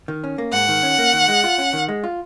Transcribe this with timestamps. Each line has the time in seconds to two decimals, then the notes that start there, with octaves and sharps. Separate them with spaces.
0.08 D#3
0.24 C#4
0.38 A#3
0.53 G#2 F#5
0.69 D#3
0.83 C#4
0.98 A#3
1.13 D#3
1.28 G#3
1.44 F4
1.58 C#4
1.73 D#3
1.89 G#3
2.04 F4